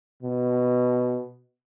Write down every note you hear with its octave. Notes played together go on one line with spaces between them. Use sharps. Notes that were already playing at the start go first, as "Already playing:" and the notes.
B2